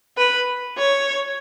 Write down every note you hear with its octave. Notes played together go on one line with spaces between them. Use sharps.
B4
C#5